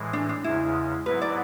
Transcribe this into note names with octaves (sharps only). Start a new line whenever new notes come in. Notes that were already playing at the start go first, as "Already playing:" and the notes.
Already playing: A2 E3 G#3
D4
D4
E2 C#3 G#3 E4
G#2 F#3 B3 E4 B4
D5